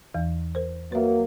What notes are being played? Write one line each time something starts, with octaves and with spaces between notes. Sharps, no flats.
E2 E3
A#4 C5
F#3 A#3 B4 E5